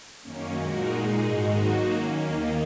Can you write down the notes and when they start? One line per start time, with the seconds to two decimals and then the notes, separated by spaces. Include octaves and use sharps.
0.22 F#2 D#3 A#3 C#4
0.56 A#2 G#3 D#4 F#4 A#4
0.89 A#2 G#3 D#4 G#4
1.22 G#2 D#3 G#3 D#4 F#4
1.56 F#3 A#3 D#4 F#4
1.90 D#3 A#3 C#4
2.24 D#2 D#3 A#3 D#4